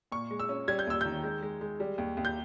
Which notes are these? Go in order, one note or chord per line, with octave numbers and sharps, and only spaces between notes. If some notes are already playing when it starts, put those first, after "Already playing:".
A#2 C#6
G#3
E6
C#4
G3 G#6
G6
D#2 E6
D#3 G6
G#3
G#3
G#3
G3
D#2
D#2
G6